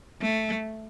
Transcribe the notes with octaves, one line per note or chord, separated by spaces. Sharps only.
A3